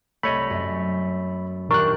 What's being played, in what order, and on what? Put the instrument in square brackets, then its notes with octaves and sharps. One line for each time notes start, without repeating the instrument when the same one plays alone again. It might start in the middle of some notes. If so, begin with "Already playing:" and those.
[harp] C2 [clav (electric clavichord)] A3 C#5 D#5 [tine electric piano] B5
[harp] F#2
[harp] D#1 G4 G6 [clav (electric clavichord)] D4 [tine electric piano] A#4 F#6 [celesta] C#6